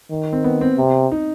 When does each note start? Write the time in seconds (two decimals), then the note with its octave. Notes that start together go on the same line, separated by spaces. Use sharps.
0.10 D#3
0.33 C4
0.44 B3
0.61 C4
0.77 C3
1.12 D#4